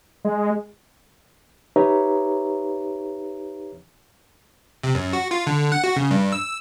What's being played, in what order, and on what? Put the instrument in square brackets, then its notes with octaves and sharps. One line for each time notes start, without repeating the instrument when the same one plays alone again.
[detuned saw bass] G#3
[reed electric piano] D#4 G4 B4 C#5 E5 A#5
[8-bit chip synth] C3
F#2
F#4
F4
D3
F#5
F#4
C#3
G2
E6